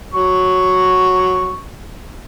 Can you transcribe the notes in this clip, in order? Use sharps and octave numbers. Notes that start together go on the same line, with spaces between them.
F#3 C#6